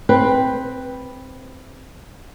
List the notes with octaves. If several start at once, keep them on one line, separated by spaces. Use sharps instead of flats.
C4 B4